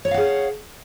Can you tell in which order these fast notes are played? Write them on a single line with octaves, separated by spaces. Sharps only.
C#5 D5 F5 F#5 G#4